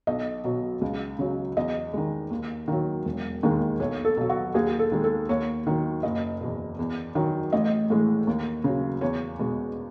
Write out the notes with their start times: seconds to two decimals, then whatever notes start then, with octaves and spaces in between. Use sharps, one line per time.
0.07 B1 D#5
0.44 B2 F#3
0.81 C#2
1.19 C#3 F#3
1.57 E2 D#5
1.94 D#3 G#3
2.31 D#2
2.68 D#3 F#3
3.05 E1
3.43 D#2 D#3 G#3
3.80 B1 C#5
4.05 A4
4.17 B2 F#3
4.29 F#4
4.54 D#2 G#4
4.79 A4
4.92 D#3 G#3
5.04 A4
5.29 D#2 C#5
5.67 D#3 F#3
6.03 F#1 D#5
6.41 E2 B2
6.79 E2
7.15 D#3 F#3
7.52 A1 D#5
7.90 A2 E3 G#3
8.27 D#2
8.64 C#3 F#3
9.01 E2 C#5
9.39 B2 G#3